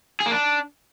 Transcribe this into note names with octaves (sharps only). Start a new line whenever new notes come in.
G#4
A#3
D4